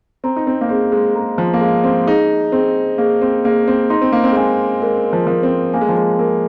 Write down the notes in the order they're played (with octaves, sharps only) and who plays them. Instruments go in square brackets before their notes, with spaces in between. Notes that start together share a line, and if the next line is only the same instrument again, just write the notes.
[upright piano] C4 [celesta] A#5
[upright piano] D#4
C4
A#3
[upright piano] C4 [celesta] G#4
[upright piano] G#3
[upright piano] G#3 [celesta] A#5
[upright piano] F3
A#3
[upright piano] G#3 [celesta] F5
[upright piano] C4
[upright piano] D#4 [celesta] G#4
[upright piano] C4 [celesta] G#4
[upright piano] A#3 [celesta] G#4
[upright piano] C4
[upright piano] A#3 [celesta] G#4
[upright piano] C4
[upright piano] D#4 [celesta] C6
[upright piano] C4
A#3
C4
G#3
[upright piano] A#3 [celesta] G#5
[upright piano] G#3 [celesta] A#4
[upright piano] F3
[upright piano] F3 [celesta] A#4
[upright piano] C4
[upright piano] A#3 [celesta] G#5
[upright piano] G#3
F3
G#3
[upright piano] A#3 [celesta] A#4